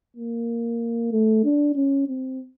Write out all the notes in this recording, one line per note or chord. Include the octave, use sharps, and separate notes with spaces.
A#3
A3
D4
C#4
C4